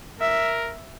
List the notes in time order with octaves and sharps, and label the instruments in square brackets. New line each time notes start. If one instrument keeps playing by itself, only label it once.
[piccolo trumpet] A#4 [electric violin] E5